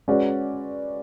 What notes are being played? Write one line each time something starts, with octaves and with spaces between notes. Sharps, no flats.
G#3 C#4 F#4 B4 D5